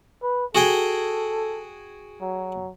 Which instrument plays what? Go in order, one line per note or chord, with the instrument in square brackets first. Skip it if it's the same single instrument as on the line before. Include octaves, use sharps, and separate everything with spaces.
[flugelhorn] B4
[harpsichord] F#4 G#4 G5 [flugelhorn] A4
[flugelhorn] F#3